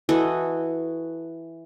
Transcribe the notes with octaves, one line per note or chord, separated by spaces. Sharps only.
E3 F#4 A4 D#5